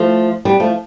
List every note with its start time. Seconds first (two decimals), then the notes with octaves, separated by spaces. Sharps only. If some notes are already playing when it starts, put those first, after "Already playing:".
Already playing: F3 A3
0.45 G3 B3
0.60 F3 A3